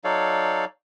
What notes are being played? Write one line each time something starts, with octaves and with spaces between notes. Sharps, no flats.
F#3 D#4 A4 C#5 D5 F5